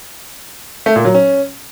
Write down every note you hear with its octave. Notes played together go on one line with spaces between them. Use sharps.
A3
A#2
F#3
C#4